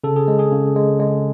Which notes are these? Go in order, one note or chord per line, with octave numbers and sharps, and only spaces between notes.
C#3 A4
G#4
G#3
G#4
C#3
G#3
G#3